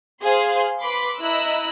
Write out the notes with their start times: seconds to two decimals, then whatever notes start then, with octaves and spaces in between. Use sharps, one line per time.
0.22 G#4 C5 F5 C6
0.80 B4 B5 C6 D6
1.21 E4 D#5 A#5 E6 F#6